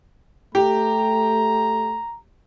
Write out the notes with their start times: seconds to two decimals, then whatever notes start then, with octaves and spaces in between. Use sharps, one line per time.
0.55 A3 G4 A#5